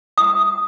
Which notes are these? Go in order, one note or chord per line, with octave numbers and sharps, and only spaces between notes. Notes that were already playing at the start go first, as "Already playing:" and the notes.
D#6